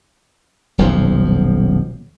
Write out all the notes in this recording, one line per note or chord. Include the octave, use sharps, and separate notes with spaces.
D#1 B1 F2 F3